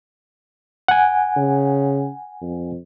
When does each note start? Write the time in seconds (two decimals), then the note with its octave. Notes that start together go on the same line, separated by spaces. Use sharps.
0.88 F#5 G#5
1.36 C#3
2.42 F2